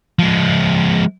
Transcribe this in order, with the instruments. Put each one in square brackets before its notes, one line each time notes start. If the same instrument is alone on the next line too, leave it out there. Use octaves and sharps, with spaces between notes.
[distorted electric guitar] F3 G#3